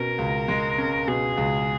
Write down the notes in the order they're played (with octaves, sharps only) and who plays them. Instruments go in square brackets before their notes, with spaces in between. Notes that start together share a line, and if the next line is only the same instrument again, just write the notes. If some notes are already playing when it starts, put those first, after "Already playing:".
Already playing: [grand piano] B2 C#4 [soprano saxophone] A#4
[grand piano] C#2
G#3
C#4
[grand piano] B2 [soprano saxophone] G#4
[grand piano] C#2